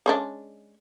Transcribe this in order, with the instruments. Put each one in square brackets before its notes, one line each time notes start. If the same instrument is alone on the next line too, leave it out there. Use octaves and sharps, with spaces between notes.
[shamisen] G#3 C#4 D4